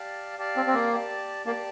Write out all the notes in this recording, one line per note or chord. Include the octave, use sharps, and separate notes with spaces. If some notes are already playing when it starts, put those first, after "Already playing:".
Already playing: G4 D5 F5 A5
G4 D5 F5 A5
C4
C4
A#3
G4 D5 A5
A#3 G4 D5 A5